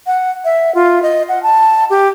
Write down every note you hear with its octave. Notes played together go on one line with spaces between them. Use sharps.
F#5
E5
F4
D#5
F#5
A5
G4